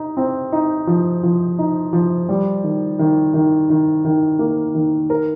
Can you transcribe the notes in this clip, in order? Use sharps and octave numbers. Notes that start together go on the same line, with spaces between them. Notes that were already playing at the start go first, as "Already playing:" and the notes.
Already playing: D#4
C4
D#4
F3
F3
D#4
F3
G3
D#3
D#3
D#3
D#3
D#3
A#3
D#3
A#4